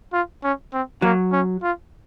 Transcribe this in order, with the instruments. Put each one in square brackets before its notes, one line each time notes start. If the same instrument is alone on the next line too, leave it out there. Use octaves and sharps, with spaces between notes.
[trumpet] F4
C#4
C4
[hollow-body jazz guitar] F#3 [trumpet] A#3
[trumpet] C#4
F4